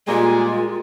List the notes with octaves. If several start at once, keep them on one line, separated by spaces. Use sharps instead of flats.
A#2 G3 G#3 F4